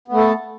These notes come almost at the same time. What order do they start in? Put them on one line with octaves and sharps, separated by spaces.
B3 A3 A4